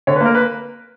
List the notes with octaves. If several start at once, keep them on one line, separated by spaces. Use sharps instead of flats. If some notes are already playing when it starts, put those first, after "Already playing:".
D3 C#5
B4
A#3
A#4
B4